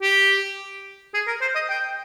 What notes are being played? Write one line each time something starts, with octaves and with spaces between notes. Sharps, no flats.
G4
G#4
A#4
C5
D#5
G5